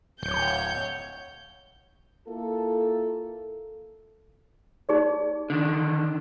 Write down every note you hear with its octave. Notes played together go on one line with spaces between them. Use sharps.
D1 C#5 G6
A#3 E4 F4 A4
D#4 G#4 D5
D3 D#3